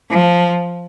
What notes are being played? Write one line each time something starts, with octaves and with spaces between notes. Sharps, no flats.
F3